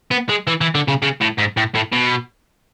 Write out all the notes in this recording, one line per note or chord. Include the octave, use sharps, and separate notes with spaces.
B3
G#3
E3
E3
D3
C#3
C#3
A2
G#2
A2
A2
B2